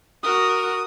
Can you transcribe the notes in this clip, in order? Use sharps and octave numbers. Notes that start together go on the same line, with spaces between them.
F#4 A#4 D#6